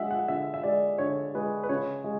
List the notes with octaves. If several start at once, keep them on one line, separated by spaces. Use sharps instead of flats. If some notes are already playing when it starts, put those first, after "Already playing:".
Already playing: D3 G#3 E5 F#5
F#5
D3 E5
E5
G#3 D5
D3 C#5
G#3 B4
B4
C#3 C#5
G#3